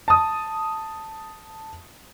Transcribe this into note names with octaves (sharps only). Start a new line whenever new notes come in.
A5 D#6